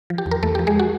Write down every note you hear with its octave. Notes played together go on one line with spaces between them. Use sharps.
F3
G4
E2
A#4
E2 A3 A4
G4
F3
G#3 G#4
F#4